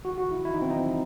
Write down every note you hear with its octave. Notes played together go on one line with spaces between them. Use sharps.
F#4
F#4
E4
E4
D#4
C4
D#4